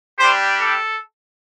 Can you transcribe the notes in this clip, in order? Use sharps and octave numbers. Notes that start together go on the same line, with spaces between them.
G3 D4 G4 C5
A4